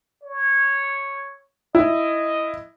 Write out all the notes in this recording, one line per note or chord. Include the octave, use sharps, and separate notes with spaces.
C#5
E4 D#5